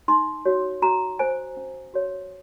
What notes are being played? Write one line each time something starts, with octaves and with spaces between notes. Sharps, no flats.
D#4 C6
F#4 C#5
F#4 A#5
C5 G#5
C#4
F#4 C#5